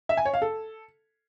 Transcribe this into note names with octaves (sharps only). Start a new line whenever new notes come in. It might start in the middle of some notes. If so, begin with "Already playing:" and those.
E5
G#5
C#5
F5
A4